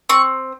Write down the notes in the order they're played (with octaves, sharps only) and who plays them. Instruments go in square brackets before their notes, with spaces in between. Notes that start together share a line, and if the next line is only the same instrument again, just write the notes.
[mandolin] C4 C#6